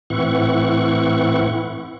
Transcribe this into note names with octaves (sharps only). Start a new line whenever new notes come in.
A2 E3 C4 E4 F#5 C#6